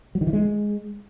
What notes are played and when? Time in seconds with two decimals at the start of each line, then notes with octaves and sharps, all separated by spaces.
0.15 F#3
0.21 D#3
0.27 E3
0.33 G#3